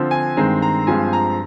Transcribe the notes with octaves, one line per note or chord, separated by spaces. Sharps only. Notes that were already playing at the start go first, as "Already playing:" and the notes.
Already playing: D3 F3 C4
G#5
G2 D#3 G#3 C4 A#5
A#5
G2 F3 G#3 C4 G#5
A#5